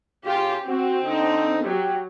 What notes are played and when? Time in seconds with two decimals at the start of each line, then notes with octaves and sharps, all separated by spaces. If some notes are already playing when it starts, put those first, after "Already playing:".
0.25 C#3 F4 G4
0.65 C4 F#4
1.02 D3 D#4
1.63 F#3 G4